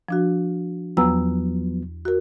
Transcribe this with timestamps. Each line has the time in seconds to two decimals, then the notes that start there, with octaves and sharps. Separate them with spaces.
0.09 F3 D4 F#4
0.97 E2 F3 F#3 B3 A#5 E6
2.05 F#4 A#4